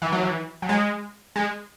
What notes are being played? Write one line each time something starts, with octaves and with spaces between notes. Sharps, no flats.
E3
F#3
E3
F#3
G#3
G#3